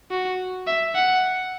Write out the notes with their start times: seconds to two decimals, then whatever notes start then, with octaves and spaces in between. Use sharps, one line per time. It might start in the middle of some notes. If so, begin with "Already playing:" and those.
0.11 F#4
0.67 E5
0.96 F#5